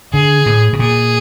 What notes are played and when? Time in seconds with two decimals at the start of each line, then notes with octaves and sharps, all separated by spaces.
0.13 D3 G#4
0.46 A2
0.73 B2
0.79 A#2 G#4